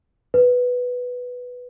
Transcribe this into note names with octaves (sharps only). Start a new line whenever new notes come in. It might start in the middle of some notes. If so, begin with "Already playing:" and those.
B4